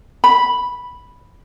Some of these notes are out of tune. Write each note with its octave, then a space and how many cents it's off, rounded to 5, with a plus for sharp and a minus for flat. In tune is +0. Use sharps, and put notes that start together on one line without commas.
B5 -5